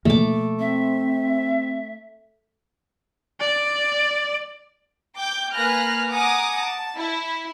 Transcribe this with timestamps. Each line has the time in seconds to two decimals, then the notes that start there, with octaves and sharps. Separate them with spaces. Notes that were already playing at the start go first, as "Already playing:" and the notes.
0.05 B2 F3 A3 A#3 D6
0.59 C4 E5
3.41 D5
5.16 G5 D6 G6
5.53 A#3 B4 G#5 F6 F#6 A#6
6.12 F#5 G#5 A#5 D6 D#6
6.61 A5
6.97 E4